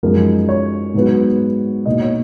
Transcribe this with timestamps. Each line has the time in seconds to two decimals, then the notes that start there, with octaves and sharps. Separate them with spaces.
0.03 F#2 F3 G#3 D#4 A#4
0.49 C#5
0.94 G#2 F#3 B3
1.86 B2 A#3 D#4 D#5
2.01 C#5